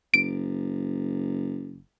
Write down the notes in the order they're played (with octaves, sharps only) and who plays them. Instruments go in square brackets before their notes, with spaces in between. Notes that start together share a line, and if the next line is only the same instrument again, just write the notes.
[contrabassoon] F#1 [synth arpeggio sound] D7